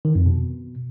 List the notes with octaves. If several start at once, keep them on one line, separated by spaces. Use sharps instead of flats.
D#3
F2
B2